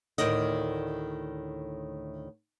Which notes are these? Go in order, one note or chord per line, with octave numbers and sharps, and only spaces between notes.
D2 A2 D#3 D5 D#5